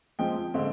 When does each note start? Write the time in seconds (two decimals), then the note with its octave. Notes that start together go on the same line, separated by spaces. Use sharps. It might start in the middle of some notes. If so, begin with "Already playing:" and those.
0.19 F3 G#3 C4 G5
0.54 D3 G#3 C4